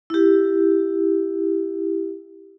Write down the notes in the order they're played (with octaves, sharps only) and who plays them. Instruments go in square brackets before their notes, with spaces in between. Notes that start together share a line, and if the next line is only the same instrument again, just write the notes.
[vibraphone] E4 G4